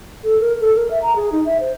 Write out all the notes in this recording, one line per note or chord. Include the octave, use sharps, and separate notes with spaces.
A4
A#4
A4
A#4
E5
A#5
G#4
D#4
E5
C5